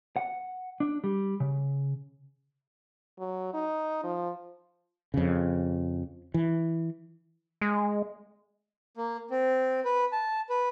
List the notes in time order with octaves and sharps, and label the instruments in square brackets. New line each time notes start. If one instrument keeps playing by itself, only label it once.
[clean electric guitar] F#5
D4
G3
C#3
[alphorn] F#3
D#4
F3
[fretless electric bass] F2 C#3
E3
[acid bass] G#3
[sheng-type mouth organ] A#3
C4
B4
A5
B4